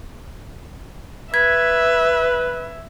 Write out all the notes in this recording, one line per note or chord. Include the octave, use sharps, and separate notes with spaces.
B4 E5 G#6 B6